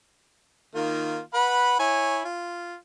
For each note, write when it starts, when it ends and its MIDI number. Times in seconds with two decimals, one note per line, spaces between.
0.75 1.19 51
0.75 1.19 58
0.75 1.19 65
1.34 1.78 71
1.34 1.78 78
1.34 1.78 83
1.79 2.23 64
1.79 2.23 73
1.79 2.23 80
2.25 2.74 65